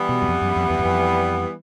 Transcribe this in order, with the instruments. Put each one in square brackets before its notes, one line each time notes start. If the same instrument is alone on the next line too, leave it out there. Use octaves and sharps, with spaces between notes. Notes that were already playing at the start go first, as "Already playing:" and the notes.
Already playing: [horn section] E3 G3 B3
[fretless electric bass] B2
F#2
F2
F#2
F2
E2
F#2
F2